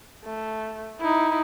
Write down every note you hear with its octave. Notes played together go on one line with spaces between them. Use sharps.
A3
D#4 E4